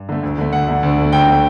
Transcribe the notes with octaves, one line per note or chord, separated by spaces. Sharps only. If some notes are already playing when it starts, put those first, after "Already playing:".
Already playing: G2
D3 A3
D2
D3 A3
D2 F#5
D3 A3
D2
D3 A3
D2 G5
D3 A3